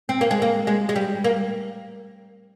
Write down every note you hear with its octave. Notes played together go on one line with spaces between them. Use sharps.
C4
A#3
G#3
A#3
G#3
G#3
G3
A#3